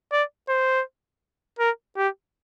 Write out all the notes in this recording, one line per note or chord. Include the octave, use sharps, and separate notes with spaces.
D5
C5
A#4
G4